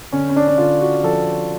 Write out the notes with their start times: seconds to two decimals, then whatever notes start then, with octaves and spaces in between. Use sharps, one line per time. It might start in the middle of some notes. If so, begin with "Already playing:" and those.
0.12 D3 C#4
0.29 C#4
0.36 D4
0.48 D4
0.58 D3 F4
0.81 F#4
1.03 F3 A4